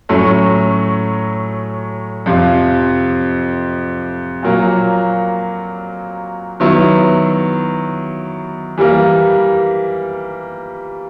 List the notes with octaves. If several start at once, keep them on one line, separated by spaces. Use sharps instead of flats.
A2 F#3 A3 C#4
F2 C3 F3
A#2 F#3 A#3
D#3 F#3 B3 E4
E3 G3 A#3